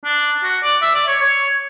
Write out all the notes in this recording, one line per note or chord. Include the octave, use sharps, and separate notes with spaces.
D4
F#4
D5
E5
D5
C#5
C#5